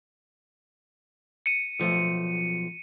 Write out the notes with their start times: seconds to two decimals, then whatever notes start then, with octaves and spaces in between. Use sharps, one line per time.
1.46 C#7 D#7
1.79 B1 F3 A3